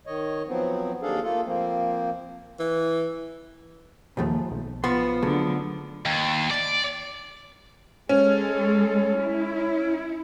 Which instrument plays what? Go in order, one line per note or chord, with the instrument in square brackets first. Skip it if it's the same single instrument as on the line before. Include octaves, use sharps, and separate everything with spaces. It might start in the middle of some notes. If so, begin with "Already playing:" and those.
[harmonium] D#3 C#5 D#5
F3 F#3 B3 C4
D#2 D4 G#4 A4 F5
A3 A#3 F4 A4
F3 A#3 C4
[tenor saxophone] E3
[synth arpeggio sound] A#1 D#2 [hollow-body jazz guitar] G#2 F3 A3
[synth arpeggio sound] B1
[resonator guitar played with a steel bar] F3 B3 [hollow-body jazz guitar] C6
[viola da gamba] D3 [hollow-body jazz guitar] F#3 A3 G#4
[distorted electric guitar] D#2
D5
[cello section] G#3 A4 [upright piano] C#4
[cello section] E4